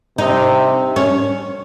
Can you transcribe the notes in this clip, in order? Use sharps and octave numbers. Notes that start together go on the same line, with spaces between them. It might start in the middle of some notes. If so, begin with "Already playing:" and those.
C3 D#4
C#4